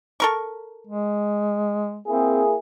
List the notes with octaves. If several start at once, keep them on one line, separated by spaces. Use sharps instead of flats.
A4 A#4 C#6
G#3
A#3 C4 E4 G#4